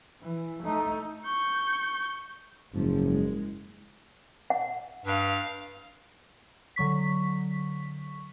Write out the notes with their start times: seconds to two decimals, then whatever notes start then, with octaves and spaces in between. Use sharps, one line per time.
0.22 E3
0.63 A3 D#4
1.25 C#6 G6
2.73 F#1 G#2 F3
3.06 G#3
4.50 F#5
5.05 G2 F5
6.76 D3 F#3 C#6 B6